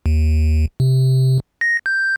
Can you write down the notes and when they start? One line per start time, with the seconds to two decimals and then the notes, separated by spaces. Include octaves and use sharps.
0.06 D#2
0.80 C3
1.61 A#6
1.86 G6